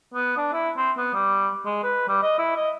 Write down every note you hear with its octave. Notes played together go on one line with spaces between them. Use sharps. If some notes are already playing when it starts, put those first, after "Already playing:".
B3
D4
E4
C4
B3
G3
G#3
B4
G3
D#5
E4
D#5